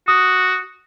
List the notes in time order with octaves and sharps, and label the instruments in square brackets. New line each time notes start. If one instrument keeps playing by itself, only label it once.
[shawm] F#4 [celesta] D#6